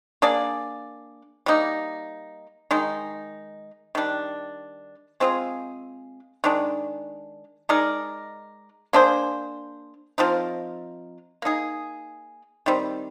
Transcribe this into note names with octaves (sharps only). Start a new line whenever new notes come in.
A#3 D4 G#4 D5
G3 A#3 D#4
D#3 G#3 D#4
D#3 G3 D4
G#3 C4 F4 G#4
D#3 G#3 D4
G#3 D#4 A#4 D5
A#3 D4 G#4 C5
F3 C4 D#4 A#4
A#3 D#4 G#4
D#3 G3 C4